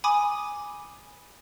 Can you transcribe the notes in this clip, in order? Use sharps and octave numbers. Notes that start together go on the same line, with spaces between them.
G#5 B5 D6 D#6 D#7